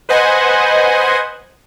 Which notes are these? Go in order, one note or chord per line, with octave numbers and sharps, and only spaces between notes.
B4 C5 D#5 F#5 G#5